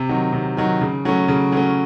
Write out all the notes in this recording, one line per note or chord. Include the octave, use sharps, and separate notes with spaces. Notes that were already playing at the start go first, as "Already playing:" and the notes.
Already playing: C3
D#3 F#3
C3
D#3 F#3
C#3
F#3 A3 C#4
C#3
F#3 A3 C#4